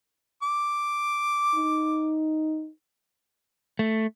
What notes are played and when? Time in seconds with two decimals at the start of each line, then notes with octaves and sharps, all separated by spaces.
0.43 D6
1.55 D#4
3.79 A3